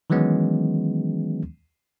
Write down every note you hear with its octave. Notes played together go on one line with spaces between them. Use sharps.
D#3 E3 F#3 G#3 B3 C#4